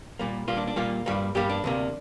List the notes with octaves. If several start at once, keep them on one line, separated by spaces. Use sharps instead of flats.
A#2 G3 A#3
A#2 G3 A#3 F4
D4
D4
A#2 G3 A#3 F4
G2 G3 A#3
G2 G3 A#3 G4
D4
D2 C3 A#3